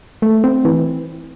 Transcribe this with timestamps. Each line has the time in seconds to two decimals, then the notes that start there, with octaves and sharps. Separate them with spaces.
0.22 A3
0.44 C4
0.65 E3